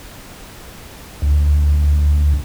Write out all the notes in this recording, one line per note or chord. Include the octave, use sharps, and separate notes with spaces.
D2